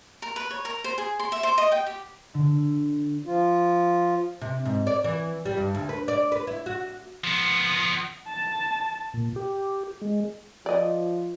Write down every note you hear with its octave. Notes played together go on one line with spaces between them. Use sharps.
A#4
B4
C#5
A#4
C5
G#4
C6
E5
C5
D#5
G5
G4
D3
F3 F4
C3
G#2
D5
E3
G3
G2
D2
B4
D5
B4
E4
F#4
F3 B3
A5
A#2
G4
G#3
F3 D5 D#5